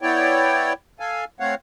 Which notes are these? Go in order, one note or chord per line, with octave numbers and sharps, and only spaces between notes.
B3 E4 C#5 D5 G5
A4 F5 G#5
A3 C4 C#5 F5 F#5